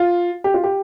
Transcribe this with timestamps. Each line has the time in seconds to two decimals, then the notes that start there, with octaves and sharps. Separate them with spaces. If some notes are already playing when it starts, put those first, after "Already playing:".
Already playing: F4
0.44 G4
0.54 F4
0.64 G4